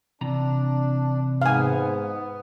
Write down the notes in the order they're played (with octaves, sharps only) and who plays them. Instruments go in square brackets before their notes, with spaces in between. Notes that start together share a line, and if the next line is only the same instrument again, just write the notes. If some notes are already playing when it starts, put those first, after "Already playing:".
[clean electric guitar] C3 E3 A#5 [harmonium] D4
[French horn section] G#2 [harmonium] B3 [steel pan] F5 G#5